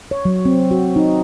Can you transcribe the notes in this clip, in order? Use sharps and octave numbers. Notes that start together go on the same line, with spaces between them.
C#5
F#3
C4
F#4
D#4